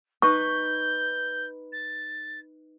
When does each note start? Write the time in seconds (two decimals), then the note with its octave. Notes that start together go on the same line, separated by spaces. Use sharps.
0.22 D#4 B4 C#6 G6
1.72 A6